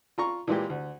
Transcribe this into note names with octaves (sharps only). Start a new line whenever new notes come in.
F4 A#5 C#6
A#2 E3 G#3 G4
D2